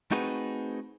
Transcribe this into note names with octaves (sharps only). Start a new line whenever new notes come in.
A3 C4 D#4 F#4 G#4 B4